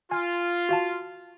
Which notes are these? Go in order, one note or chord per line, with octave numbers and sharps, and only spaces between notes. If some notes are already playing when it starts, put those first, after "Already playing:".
F4 G#5
F#4 F5 A5